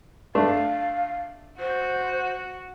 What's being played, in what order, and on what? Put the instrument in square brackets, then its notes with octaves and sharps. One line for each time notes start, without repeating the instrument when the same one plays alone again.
[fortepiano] A3 D4 [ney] F5
[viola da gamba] F#4 [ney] C5